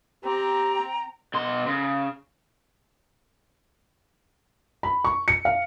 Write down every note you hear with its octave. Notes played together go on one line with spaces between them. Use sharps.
C4 G4 G5 A#5
B2 C6
C#3
B5
C#6
C#7
F5